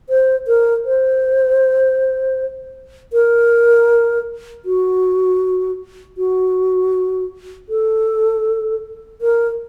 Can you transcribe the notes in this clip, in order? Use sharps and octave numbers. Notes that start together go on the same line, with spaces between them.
C5
A#4
C5
A#4
F#4
F#4
A4
A#4